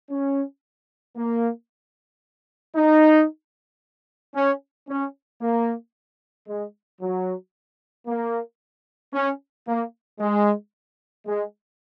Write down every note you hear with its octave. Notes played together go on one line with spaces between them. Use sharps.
C#4
A#3
D#4
C#4
C#4
A#3
G#3
F#3
A#3
C#4
A#3
G#3
G#3